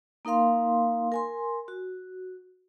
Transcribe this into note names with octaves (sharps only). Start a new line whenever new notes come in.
A#3 D#4 A#4 F5 C6
A#4 G#5 C6
F#4